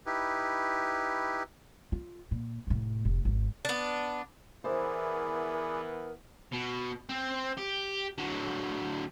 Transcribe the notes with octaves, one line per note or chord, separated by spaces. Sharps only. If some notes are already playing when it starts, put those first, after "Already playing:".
D#4 E4 G4 B4
F4
A#2
F1 A2
F1
G#1 E2
B3 D4
E3 B3 E4 G#4 A#4 C5 D5
B2
C4
G4
D3 F#3